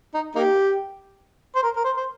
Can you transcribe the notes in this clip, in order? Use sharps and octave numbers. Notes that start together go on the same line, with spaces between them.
D#4
A#3 D#4 G4
C5
A#4
A#4
C5
C5